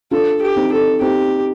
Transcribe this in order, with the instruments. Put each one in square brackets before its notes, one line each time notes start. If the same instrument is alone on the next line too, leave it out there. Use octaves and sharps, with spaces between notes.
[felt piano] D4 F4 [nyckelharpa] A4
[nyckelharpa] G4
[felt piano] C4 D#4
[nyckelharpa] A4
[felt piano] C4 D#4 [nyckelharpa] G4